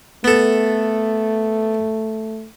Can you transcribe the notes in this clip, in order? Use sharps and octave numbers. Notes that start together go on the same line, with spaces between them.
A3 B3 A4